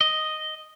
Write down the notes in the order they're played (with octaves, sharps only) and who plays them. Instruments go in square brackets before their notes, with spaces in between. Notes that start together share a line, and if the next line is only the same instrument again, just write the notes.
[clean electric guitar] D#5